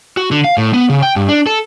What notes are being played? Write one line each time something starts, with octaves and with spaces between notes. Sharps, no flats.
F#4
D3
F5
A2
B3
C#3
G5
G2
D4
A4